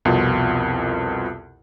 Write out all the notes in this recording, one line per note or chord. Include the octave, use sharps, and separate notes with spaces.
C2 F2 B2 F4 A#4